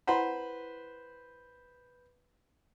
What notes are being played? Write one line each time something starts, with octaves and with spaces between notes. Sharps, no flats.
E4 B4 C5 F#5 B5